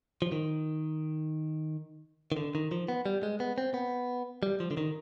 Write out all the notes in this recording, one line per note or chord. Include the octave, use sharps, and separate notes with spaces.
F3
D#3
D#3
D3
D#3
F3
B3
G3
G#3
B3
C4
B3
G3
F3
D3
D#3